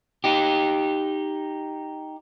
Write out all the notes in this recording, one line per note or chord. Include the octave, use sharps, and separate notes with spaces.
D#4 G4